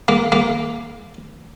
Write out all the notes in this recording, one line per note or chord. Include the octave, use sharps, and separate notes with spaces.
A#3
A#3